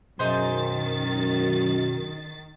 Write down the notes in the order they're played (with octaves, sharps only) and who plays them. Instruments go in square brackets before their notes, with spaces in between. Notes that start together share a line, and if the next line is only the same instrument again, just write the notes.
[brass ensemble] F#2 [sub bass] B2 [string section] D#3 A6 [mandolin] D#4 G#4 C5